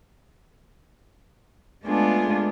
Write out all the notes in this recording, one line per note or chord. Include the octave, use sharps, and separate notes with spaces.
G#3 A3 B3 D4 F4 G#4